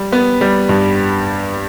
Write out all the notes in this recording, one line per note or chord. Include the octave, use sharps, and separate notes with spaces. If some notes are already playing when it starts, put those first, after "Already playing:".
Already playing: G3
B3
G3
G2